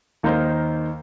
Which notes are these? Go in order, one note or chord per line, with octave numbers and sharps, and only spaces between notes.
D#2 D#3 A#3 D#4 C5